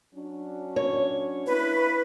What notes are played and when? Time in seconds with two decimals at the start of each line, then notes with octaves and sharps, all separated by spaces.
0.14 F#3 C#4 D4
0.76 C#5
1.47 A#3 E4 B4